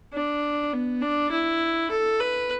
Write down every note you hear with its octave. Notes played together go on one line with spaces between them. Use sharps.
D4
B3
D4
E4
A4
B4